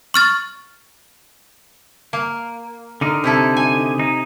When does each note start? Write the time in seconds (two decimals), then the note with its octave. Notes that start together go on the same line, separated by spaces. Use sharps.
0.14 C#6 F6 A6
2.13 A#3
3.01 D3 D#4 A#4
3.24 C3 E4 A4
3.57 G#5
3.99 D#4